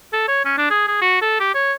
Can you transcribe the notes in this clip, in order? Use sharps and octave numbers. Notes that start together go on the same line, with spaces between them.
A4
C#5
C#4
D4
G#4
G#4
F#4
A4
G4
C#5